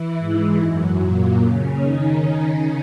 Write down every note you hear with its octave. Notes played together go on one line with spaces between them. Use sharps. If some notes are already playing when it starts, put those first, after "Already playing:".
Already playing: E3 E4
G#2 G#3
F#2 F#3
A#2 A#3
C#3 C#4
D#3 D#4